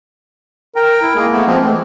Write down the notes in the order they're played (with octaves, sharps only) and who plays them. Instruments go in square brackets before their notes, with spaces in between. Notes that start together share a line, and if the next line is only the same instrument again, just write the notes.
[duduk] A#4 [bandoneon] G5
[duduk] E4
[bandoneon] G#3 G#4 [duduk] A#3
[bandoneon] A3 B3
F3 G#3 C4
[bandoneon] E3 [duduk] A3